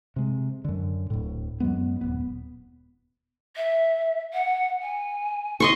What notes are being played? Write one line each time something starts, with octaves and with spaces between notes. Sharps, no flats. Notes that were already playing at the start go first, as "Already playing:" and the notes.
C3 G#3
F#2 D3
D1 A2
F#2 F#3 G#3 B3
D#1 E2 B3
E5
F#5
G#5
D#5 C6 C#6